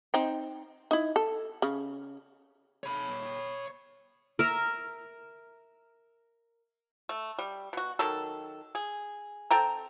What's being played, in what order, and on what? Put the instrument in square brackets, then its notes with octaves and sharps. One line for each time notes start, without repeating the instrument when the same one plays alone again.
[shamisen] C4 D#4
D#4 E4
A4
C#3
[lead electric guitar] C#5 B5
[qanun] A#4 E5
[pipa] A3
G3
B2 F#4
D#3 F#3 A4
G#4
C4 A4 G5 A#5